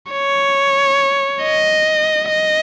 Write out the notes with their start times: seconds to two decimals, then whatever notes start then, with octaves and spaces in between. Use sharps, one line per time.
0.12 C#5
1.43 D#5
2.29 D#5